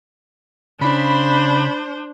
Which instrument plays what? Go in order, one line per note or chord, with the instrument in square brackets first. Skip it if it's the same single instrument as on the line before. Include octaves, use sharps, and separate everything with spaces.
[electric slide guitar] C#3 [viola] D4 C5 [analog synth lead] B5